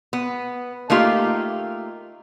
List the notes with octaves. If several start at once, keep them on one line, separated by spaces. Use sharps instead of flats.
B3
A3 A#3 D#4 F4 G4